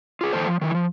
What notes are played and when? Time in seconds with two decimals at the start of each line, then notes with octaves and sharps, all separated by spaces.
0.21 F4 G#4
0.33 D#3 E3 A3 A4 C5
0.47 F3
0.61 D#3 E3
0.75 F3